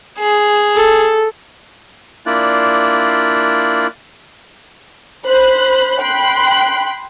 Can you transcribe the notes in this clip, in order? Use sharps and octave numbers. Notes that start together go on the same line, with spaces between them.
G#4
A4
A#3 D4 E4 F4 D5 F#6
C5 B5 F#6
G5 B5 C6 F#6